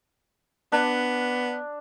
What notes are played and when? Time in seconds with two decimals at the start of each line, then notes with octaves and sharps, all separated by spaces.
0.72 B3 D4